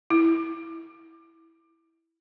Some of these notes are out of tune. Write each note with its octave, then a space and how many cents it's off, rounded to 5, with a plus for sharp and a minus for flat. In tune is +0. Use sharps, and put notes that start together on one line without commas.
E4 -5